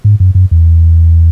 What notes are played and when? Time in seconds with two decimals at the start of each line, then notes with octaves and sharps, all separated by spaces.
0.04 G#2
0.20 F#2
0.35 F#2
0.51 E2